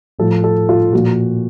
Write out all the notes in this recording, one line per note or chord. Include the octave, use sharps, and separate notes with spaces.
A2 F3 A4
A4
F4
A#2 F3 F#4